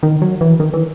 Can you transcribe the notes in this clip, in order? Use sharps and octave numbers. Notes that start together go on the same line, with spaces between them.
D#3
F#3
E3
D#3
E3